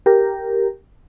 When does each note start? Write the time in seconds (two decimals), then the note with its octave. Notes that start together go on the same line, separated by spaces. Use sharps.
0.06 G4 A#4